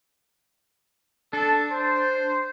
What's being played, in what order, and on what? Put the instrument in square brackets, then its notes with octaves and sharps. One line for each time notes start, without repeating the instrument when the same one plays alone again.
[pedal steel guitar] D4 [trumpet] A4
[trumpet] C5